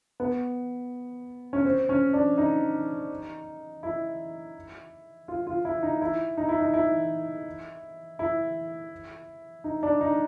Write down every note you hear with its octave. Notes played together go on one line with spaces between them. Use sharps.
B3
C#4
C4
C#4
D4
D#4
E4
F4
F4
E4
D#4
E4
D#4
E4
D#4
E4
E4
D#4
D4
D#4